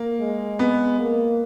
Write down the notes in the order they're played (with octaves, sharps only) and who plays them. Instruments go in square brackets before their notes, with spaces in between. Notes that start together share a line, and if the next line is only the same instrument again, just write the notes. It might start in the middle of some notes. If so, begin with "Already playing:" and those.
Already playing: [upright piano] A#3
[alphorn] G#3
[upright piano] B3
[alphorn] A#3